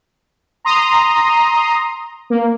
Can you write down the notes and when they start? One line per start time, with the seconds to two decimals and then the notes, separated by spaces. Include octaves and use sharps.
0.65 A#5 C6 D#6
2.30 A#3